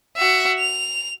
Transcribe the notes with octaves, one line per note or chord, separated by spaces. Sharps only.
F#4 E5
F7